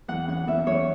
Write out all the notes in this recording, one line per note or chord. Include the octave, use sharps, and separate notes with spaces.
E2 F#5
C#4 F#5
E2 E5
E2 C#5